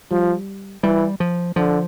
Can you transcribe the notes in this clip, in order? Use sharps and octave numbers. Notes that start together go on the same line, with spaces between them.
F3 G3
E3 G3
F3
D3 F3